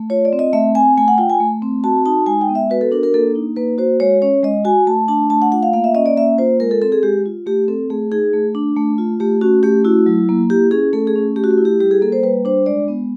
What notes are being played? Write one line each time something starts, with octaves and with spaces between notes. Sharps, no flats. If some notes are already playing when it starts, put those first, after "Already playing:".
Already playing: A3
F4 C#5
D5
C4
D#5
A3 E5
C4 G#5
A3 G#5
F#5
F4 G5
G#5
A3
C4
F#4 A5
D#4 A5
G#3 G#5
G5
B3
E5
F#4 B4
A4
D4 A#4
A#4
A#3 A4
D#4
A#3 B4
F#4 C5
G#3 C#5
C#4 C#5
G#3 D#5
F#4 G#5
A3 A5
D4 A5
A3 A5
F#5
F4 F#5
F5
A#3 F5
E5
C#4 D#5
D5
A#3 E5
F4 C5
G#3 A#4
A4
C4 A4
G#4
G#3 G4
F4
A3 G4
C4 A4
A3 G#4
D#4 G#4
A3
D4
A3
F4
A3 G4
C#4 F#4
A3 G4
E4 F#4
F#3
A#3
E4 G4
C#4 G#4
A3 A4
G#4
C#4
A3 G4
F#4
G4
E4
G4
G3 G4
G#4
A#3 A4
C5
G3 B4
D4 C5
G#3 D5
B3